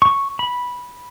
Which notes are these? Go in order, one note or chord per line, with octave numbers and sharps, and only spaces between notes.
C#6
B5